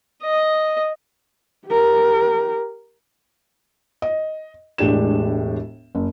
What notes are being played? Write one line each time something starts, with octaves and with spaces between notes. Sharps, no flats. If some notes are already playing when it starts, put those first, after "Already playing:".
D#5
G4 A#4
D#5
E1 A2 G#3 D4 G4 E7
F#1